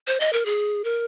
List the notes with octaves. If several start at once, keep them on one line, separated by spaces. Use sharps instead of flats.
C5
D#5
A#4
G#4
A#4